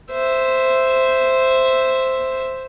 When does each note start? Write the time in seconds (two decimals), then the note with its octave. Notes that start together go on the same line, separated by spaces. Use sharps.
0.12 C5 E5